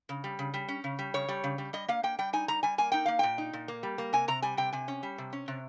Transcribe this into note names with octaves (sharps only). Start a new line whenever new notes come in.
C#3
G3
C#3
G3
C#4
C#3
G3
C#3 C#5
G3
C#3
G3
G3 D#5
A#3 F5
A#3 G5
G3 G5
D#4 G#5
G3 A#5
G3 G#5
A#3 G#5
D#4 G5
A#3 F5
A#2 G5
D#4
A#2
A#3
G3
A#3
C3 G#5
C3 A#5
G3 G#5
C3 G5
C3 G#5
C#4
G3
C3
C#4
C3